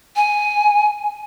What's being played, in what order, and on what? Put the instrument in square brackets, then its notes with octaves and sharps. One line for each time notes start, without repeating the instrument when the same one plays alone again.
[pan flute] G#5